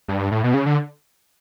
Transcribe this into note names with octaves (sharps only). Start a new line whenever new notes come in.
G2
A2
B2
C#3
D3